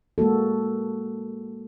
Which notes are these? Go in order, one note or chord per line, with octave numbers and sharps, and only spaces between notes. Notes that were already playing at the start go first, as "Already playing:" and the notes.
G#3 A#3 F#4 A4